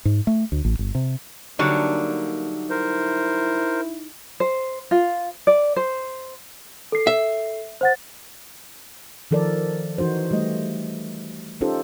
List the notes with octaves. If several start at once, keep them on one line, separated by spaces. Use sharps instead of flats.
G#2
A3
D2
A1
G1
C3
D3 F#3 G3 A#3 D#4 E5 A5
E4 A#4 C5
C5
F4
D5
C5
A4 C7
E5
C5 F#5 A6
D#3 F3 A4 A#4 D5
E3 D#4 F#4 C5
G3 A3 G4 D#5
C#4 D#4 F4 G4 A4 C5